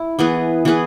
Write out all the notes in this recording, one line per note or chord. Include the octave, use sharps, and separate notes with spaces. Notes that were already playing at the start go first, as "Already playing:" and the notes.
Already playing: E4
E3 B3 G#4 B4
E3 B3 G#4 B4